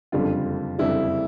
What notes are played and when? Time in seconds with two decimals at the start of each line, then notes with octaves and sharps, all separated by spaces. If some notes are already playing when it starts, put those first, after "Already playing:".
0.12 F#1 F2 D3 G3 F4
0.78 F#1 F2 D3 G3 E4